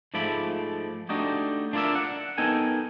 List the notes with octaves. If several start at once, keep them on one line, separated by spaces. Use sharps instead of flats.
G#2 F3 A3 D5 B5
A3 D4 D#4 F#4 G4
D4 F4 A#4 D5 E5
F#5
B3 D#4 A4 A#4 G5 G#5